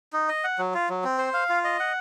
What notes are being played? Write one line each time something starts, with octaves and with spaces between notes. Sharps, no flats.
D#4
D#5
F#5
F#3
F4
F#3
C4
C5
F5
F4
D#5
F#5